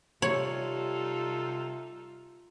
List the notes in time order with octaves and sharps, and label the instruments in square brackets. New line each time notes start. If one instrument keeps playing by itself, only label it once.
[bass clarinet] C3 [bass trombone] G3 [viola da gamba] D#4 F4 A4 [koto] C#5